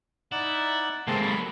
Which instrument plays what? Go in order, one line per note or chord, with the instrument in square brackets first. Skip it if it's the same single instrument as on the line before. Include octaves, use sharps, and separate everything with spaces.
[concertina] D#4 D5 F#5 [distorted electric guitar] E4
[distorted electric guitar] C#3 E4 [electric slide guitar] G#3 A#3 [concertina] C4 A5
[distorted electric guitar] F#3 [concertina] B5